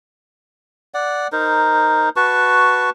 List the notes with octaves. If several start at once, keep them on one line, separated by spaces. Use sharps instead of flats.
D5 F#5
D#4 A#4 C5
F#4 B4 A5 C#6